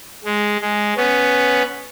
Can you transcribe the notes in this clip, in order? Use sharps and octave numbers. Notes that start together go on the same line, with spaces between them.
G#3
G#3
B3 C#4